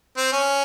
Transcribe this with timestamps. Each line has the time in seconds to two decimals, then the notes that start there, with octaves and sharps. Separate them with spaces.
0.17 C4
0.32 C#4